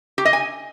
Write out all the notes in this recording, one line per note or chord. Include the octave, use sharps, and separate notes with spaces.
G4
D#5
G#5